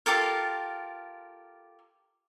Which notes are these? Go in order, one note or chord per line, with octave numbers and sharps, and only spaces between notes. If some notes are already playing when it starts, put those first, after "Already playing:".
F4 G4 A4 A#4